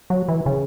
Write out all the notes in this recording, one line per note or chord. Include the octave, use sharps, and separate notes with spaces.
F#3
E3
C#3